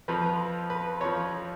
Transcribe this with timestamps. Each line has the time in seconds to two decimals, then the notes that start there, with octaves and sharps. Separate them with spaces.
0.08 F2 F3 B4
0.70 B4
1.01 F2 F3 C#5